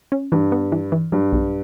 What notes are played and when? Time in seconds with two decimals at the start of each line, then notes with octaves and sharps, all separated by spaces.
0.12 C#4
0.32 G2 E3
0.52 B3
0.72 E3
0.92 E3
1.12 G2 F#3
1.33 B1